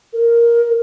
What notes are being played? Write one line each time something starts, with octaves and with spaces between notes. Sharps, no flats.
A#4